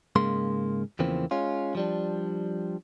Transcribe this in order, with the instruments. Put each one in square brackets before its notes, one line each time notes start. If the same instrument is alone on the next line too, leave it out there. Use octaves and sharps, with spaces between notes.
[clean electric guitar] G#2 C#3 G#3 A#3 C6
E2 C#3 E3 F3 A#3 C4
G#3 C#4 F4
F3 G3 D4